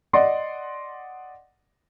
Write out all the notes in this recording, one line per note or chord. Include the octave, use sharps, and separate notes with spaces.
D5 D#5 F#5 C6